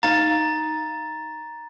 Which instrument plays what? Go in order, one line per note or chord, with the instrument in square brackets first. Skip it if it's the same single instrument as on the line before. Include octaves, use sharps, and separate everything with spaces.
[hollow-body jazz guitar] D#4 F5 [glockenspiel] A#5 A6